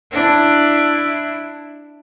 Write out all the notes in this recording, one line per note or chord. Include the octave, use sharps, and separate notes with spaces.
D4 E4